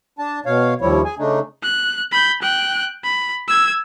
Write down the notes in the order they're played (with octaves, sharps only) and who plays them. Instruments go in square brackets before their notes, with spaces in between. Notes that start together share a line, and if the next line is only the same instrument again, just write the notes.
[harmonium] D4 A5
B2 C#5 F5
D#2 F3 G3 E4 C#5
G#4 G#5
C#3 A3 D4 D#4
[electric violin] F#6
B5 G6
G5 F#6
B5
E6 G#6